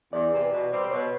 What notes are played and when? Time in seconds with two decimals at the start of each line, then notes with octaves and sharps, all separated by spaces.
0.13 E2 D5
0.32 C3 E3
0.52 B2
0.71 G3 C4
0.85 C5
0.91 B2 C#5